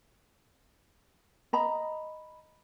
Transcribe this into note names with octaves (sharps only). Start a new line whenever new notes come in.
D#5 A#5 B5